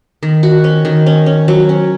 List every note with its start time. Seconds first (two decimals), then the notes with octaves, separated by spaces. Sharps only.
0.23 D#3
0.43 F#4
0.64 C#4
0.85 D#3
1.06 C#4
1.26 C#4
1.48 F#3
1.69 C#4